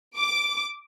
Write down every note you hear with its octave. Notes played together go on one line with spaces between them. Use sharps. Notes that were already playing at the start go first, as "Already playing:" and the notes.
D6